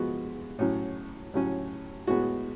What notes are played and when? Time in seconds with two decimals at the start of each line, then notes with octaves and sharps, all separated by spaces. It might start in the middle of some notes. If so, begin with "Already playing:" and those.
Already playing: F3 G#3 B3 F#4
0.59 A2 F#3 C#4
1.34 A2 F#3 C#4
2.07 A2 G#3 B3 F#4